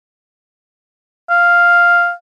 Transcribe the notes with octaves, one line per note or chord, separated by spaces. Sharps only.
F5